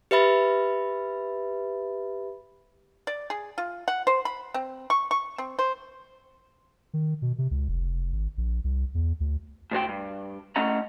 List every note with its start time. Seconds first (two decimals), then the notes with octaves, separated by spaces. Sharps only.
0.11 G4 B4 E5 B5 A6
3.07 D5
3.30 G#4
3.58 F4
3.88 F#5
4.07 C5
4.25 B5
4.54 C4
4.90 C#6
5.11 C#6
5.38 C4
5.59 C5
6.94 D#3
7.22 B2
7.38 C3
7.51 C#2
7.68 F1
8.12 G#1
8.38 A#1
8.64 C2
8.95 E2
9.20 D2
9.71 A2 C3 F#4 G5
9.89 G2
10.56 A2 A3 C#4 D#5 F#5 A#5